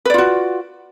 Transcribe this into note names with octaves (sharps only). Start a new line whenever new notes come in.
F4 F#4 B4 D5